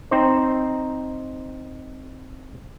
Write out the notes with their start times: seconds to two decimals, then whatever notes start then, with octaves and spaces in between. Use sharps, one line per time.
0.11 C4 D#4 C5